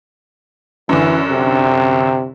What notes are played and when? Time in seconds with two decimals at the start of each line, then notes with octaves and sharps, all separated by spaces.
0.89 F#2 D3 E3
1.29 C3